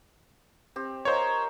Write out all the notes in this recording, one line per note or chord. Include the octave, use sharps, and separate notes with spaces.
C4 G4
F4 A#4 C5 C#5 D#5